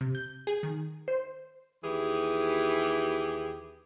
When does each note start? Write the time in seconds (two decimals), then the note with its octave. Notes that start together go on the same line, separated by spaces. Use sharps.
0.01 C3
0.15 G6
0.47 G#4
0.63 D#3
1.08 C5
1.83 D#2 E3 G4 G#4